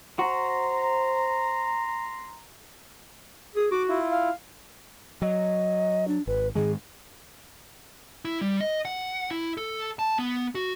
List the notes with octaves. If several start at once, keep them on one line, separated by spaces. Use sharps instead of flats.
F#4 C5 A#5 C6
G#4 D#6
F#4 D6
E4 F4
F5
F#3 D#5
D4
G#1 B4
G#2 D#3 G#3 G#4
E4
G3
D#5
F#5
E4
A4
A5
B3
F#4